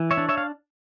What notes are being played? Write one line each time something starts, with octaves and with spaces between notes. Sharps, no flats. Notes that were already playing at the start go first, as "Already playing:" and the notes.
Already playing: E3
C#5 E5
D4
C#5 E5
F5